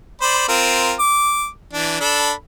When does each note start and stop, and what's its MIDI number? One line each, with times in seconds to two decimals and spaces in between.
0.21 0.46 72
0.21 0.46 74
0.21 0.46 83
0.48 0.94 60
0.48 0.94 65
0.48 0.94 70
0.99 1.47 86
1.73 1.98 52
1.73 1.98 62
2.01 2.32 62
2.01 2.32 69
2.01 2.32 83